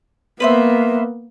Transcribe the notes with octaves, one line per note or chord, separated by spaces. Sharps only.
A#3 B3 B4 C5 E5